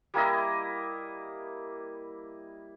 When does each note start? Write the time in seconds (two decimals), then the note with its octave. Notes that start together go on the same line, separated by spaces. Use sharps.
0.14 G3 A#3 E4 D#5